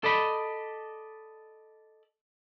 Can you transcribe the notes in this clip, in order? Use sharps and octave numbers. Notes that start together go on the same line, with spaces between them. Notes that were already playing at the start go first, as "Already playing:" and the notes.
A4 D5 D#5 B5